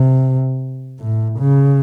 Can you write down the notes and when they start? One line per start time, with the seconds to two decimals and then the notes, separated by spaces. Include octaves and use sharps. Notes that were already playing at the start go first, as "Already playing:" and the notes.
Already playing: C3
1.00 A2
1.40 C#3